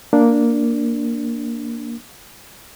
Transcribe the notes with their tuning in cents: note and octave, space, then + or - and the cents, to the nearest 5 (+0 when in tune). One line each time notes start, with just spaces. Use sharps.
A#3 +0 D4 -5